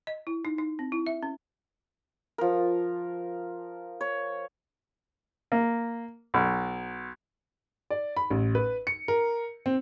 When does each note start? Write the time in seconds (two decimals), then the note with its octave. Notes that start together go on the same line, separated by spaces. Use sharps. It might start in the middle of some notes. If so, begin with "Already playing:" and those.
0.07 D#5
0.27 E4
0.45 D#4
0.58 D#4
0.79 C4
0.92 E4
1.07 E5
1.23 C#4
2.38 F3 A#4
4.01 C#5
5.52 A#3
6.34 B1
7.90 D5
8.17 B5
8.31 A1
8.55 B4
8.87 C#7
9.08 A#4
9.66 C4